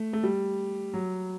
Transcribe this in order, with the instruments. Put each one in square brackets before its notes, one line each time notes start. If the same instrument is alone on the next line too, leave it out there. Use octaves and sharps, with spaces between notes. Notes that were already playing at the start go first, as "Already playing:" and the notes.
Already playing: [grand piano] A3
A3
G3
F#3